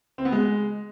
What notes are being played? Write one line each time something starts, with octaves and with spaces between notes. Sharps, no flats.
C4
B3
G#3